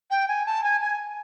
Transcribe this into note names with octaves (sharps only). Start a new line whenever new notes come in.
G5
G#5
A5
G#5
G#5